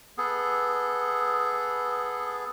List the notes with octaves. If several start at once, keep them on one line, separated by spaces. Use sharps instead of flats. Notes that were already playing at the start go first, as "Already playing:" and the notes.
B3 G#4 A4